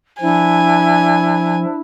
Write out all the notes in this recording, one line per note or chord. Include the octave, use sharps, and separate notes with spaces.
F3 D4 E4 G#5